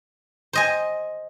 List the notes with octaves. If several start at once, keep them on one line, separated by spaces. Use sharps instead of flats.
C5 D#5 G#5